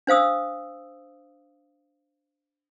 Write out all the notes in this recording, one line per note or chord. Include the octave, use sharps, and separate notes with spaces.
D4 C5 F5 D#6 E6